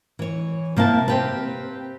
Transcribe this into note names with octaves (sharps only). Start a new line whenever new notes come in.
E3 C#5
C3 A#3 E4 A5
C4 G4 B4